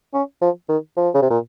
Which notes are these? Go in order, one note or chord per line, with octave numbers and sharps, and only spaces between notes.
C#4
F3
D#3
F3
C#3
C3
A#2